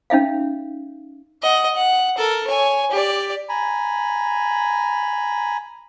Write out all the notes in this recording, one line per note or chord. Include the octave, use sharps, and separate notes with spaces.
C#4 D#4 E5 F5
D#5 F#5
F#5
A4 A#4
C#5 G#5
G4 D5
G#5 A#5 B5